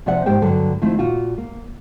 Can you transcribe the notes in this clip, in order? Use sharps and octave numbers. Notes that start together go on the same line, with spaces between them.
C3 F3 D5 E5 F#5
G#2 G4 C5 G5
G2 D3 F#3 A4
D#3 F3 A3 C4 E4
A#2 F4 F#4
A#3